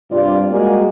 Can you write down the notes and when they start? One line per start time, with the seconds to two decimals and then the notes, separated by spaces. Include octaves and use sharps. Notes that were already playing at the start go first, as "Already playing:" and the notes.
0.11 G2 C3 G3 F4 D5
0.52 G3 G#3 A#3 F#4 G#4